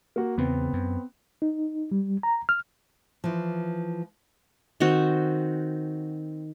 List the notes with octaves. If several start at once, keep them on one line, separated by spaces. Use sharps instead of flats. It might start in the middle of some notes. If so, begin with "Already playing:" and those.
A#3 F#4
E2 C#3 B3 C4
F#2
D#4
G3
A#5
F6
E3 F3
D#3 C4 F#4